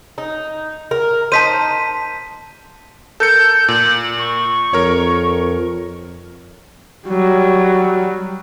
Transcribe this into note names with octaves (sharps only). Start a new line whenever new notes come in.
D#4
A#4
D#4 C5 A5 B6 D#7
A4 A#4 G6 C#7
A#2 F#7
C#6
F2 A#4 C#5
F#3 G3